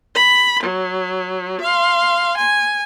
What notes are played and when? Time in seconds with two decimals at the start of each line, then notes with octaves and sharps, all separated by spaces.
0.15 B5
0.64 F#3
1.61 F5 C6
2.37 G#5